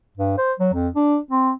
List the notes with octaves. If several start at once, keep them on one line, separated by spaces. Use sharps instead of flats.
G2
C5
F#3
F2
D4
C4